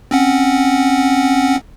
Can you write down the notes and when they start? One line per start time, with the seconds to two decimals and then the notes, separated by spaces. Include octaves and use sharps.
0.11 C4 C#4 F#5